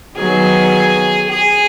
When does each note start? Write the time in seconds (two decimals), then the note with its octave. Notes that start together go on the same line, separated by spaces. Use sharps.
0.17 D#3 F#3 B3 G#4
1.29 G#4